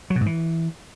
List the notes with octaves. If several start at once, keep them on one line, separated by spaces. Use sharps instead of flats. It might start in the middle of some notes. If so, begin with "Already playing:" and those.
F#3
B2
G#2
E3